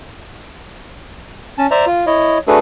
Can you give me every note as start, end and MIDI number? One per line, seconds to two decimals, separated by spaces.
1.58 1.67 61
1.58 1.67 81
1.71 1.85 72
1.71 1.85 74
1.71 1.85 76
1.71 1.85 82
1.87 2.05 65
2.07 2.38 64
2.07 2.38 73
2.07 2.38 75
2.47 2.59 57
2.47 2.59 62
2.47 2.59 66
2.47 2.59 68
2.47 2.59 69
2.47 2.59 71